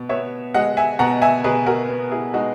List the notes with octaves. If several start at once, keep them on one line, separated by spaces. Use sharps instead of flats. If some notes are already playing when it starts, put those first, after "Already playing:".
Already playing: B2
B3 C#5 E5
G#3 D#5 F#5
E5 G#5
B2 F#5 A#5
E5 G#5
B2 G#4 B4
F#4 A#4
B3
E4 G#4
G#3 D#4 F#4